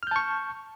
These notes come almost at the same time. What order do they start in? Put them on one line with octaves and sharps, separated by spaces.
F6 G6 A5 C#6